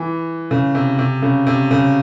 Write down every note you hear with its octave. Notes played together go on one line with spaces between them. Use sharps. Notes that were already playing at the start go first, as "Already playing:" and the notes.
Already playing: E3
C#3
C3
C3
C#3
C3
C#3